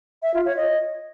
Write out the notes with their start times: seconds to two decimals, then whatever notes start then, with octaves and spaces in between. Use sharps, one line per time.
0.23 E5
0.34 F4
0.45 C#5
0.57 D#5